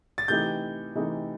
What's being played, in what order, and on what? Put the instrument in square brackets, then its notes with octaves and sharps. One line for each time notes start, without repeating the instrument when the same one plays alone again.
[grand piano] A6
[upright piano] C3 E3 A3 D#4 G4 [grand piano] G6
[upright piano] C3 E3 A3 D#4 G4